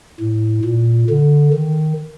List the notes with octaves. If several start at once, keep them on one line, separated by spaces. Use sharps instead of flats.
A2
A#2
D3
D#3